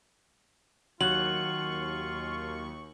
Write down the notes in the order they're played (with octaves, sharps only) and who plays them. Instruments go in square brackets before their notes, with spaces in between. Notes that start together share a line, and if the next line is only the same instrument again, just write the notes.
[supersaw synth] D#2 C#6 [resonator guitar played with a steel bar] F#3 [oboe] F4 [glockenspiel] F#7